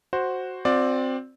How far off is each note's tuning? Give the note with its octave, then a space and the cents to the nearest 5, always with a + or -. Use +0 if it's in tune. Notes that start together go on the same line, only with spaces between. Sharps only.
F#4 +0 C5 +5
C4 +0 F#4 -45 D5 +5